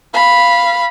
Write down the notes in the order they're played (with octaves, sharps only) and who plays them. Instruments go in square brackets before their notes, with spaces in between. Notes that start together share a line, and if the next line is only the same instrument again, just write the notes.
[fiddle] F5 B5